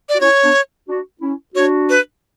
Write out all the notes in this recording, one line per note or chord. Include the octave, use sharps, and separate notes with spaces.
D5
F#4
C#4 E4 C#5
B3 D4
D4 F#4
C#4 E4
D4 F#4 C#5
B4